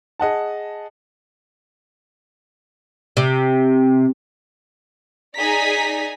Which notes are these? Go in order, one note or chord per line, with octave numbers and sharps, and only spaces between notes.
G#4 D#5 F#5 A5
C3
D#4 G#4 D5 G#5 A#5 B6